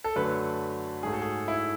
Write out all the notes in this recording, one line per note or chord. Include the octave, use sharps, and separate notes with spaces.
A4
F#2 D3 A3 B4
G#2 F#3 A3 G#4
A4
G#4
E4